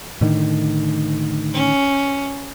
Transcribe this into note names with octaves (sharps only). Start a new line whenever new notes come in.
A2 D3 D#3
C#4